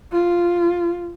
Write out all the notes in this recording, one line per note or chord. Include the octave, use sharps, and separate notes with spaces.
F4